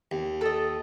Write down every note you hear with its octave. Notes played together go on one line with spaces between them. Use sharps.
D#2
A4 D#5